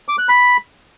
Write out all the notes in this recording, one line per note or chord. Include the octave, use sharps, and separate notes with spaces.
D6
F#6
B5